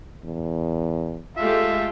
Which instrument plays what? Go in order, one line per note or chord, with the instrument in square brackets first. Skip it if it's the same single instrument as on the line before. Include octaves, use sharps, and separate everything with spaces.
[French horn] E2
[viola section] G#3 A3 G4 [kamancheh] F4 A4 [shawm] E5